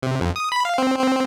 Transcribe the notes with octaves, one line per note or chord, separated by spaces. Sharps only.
C3
F2
D#6
B5
F5
C4
C4